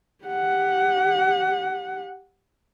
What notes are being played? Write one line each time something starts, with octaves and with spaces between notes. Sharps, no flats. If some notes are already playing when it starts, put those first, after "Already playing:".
G4 F#5